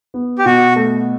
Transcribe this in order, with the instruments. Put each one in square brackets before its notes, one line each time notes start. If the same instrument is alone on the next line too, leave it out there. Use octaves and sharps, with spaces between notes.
[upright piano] B3
[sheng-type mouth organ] G4
[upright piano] B2 [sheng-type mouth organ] F#4
[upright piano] A3